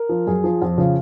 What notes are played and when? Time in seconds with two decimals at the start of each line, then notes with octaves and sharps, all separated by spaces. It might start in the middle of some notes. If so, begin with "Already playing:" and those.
Already playing: A#4
0.09 F3
0.27 F#2 G#4
0.44 F3
0.62 F2
0.78 C#3 F3